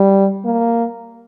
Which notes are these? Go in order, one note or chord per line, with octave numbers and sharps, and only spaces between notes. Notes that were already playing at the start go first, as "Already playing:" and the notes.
Already playing: G3
A#3